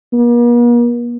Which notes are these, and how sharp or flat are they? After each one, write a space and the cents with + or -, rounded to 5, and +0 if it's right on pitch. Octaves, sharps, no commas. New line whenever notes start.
A#3 +45